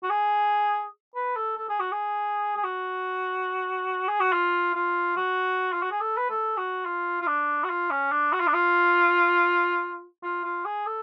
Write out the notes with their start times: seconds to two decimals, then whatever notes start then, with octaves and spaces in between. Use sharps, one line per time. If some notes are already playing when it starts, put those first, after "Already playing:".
0.03 F#4
0.10 G#4
1.15 B4
1.36 A4
1.58 A4
1.69 G#4
1.80 F#4
1.92 G#4
2.57 G#4
2.64 F#4
4.08 G#4
4.20 F#4
4.33 F4
4.75 F4
5.17 F#4
5.73 F4
5.82 F#4
5.91 G#4
6.01 A4
6.18 B4
6.30 A4
6.57 F#4
6.86 F4
7.22 F4
7.27 D4
7.64 F#4
7.70 F4
7.91 C#4
8.12 D4
8.33 F#4
8.40 F4
8.47 D4
8.54 F4
10.23 F4
10.44 F4
10.65 G#4
10.86 A4